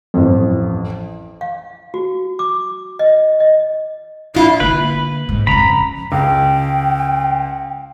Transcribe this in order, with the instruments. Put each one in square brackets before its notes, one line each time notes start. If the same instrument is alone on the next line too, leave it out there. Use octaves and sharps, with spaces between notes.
[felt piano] A1 F2
[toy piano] F5
F#4
D6
D#5
D#5
[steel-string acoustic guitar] D4 F4 [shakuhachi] E4
[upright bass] D3 A#3 [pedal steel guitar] B4
[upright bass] G#2
[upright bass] F2 C#3 [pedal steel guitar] A#5 B5
[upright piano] C#2 [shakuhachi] G5